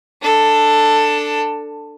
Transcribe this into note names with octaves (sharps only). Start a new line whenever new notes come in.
D4 A4